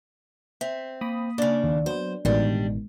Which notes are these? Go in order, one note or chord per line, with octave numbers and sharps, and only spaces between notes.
C4 E5
A#3 B5 D#6
C#3 A#3 D4
D#2
F#3 B3 C5
A1 B2 D#3 G3 G#3 D4